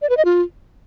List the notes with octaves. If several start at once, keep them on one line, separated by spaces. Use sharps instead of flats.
D5
B4
D#5
F4